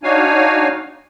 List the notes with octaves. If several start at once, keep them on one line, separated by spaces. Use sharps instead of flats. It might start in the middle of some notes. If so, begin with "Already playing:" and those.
D4 D#4 F#4 C#5 F5 G#5